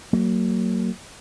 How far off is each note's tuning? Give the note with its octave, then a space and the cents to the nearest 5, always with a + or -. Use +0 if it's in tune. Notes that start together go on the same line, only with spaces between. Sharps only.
F#3 +15 A#3 -25